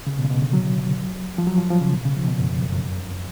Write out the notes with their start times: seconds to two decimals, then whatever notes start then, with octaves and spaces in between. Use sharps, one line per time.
0.07 C#3
0.19 B2
0.25 C#3
0.30 B2
0.42 D3
0.53 F#3
1.38 F3
1.47 F#3
1.58 F3
1.70 F3
1.81 C#3
1.93 B2
2.05 C#3
2.17 F3
2.28 B2
2.40 F#2
2.51 F2
2.63 F#2
2.74 F#2
2.86 F#2
2.98 F2